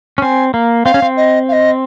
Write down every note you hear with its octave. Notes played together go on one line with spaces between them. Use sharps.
C#4
C4 G#5
A#3
C4 F5
C#4
C4
D#5
F5
D#5